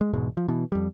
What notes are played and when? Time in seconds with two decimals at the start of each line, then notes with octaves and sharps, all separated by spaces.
0.01 G#3
0.13 E1 G#2 B2 G#3
0.37 F3
0.48 B2 E3
0.72 F2 G3